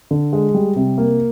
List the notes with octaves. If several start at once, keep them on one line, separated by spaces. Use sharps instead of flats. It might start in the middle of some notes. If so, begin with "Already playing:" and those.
D3
G#3
G3
C3
A#3